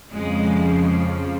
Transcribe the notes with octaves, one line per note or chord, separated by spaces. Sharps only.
F2 C#3 F3 G#3